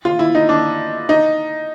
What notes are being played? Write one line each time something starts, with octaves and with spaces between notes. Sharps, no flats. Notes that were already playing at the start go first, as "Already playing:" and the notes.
F4
E4
D#4
D4
D#4